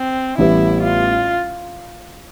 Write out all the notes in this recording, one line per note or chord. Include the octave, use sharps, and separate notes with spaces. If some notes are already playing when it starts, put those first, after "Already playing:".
Already playing: C4
A1 A2 G3 B3 E4
F4